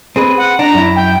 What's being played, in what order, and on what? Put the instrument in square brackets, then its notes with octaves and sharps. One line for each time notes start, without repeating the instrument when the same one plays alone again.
[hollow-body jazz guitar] C4 G#4 B4
[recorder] F#5
[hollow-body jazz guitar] D4 [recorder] A#5
[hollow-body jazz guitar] F#2 E4
[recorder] G5